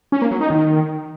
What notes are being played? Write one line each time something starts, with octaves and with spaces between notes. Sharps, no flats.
C#4
A#3
F#3
D#4
D#3